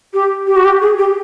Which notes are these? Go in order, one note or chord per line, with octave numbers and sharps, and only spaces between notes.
G4
G4
F#4
G4
G#4
G4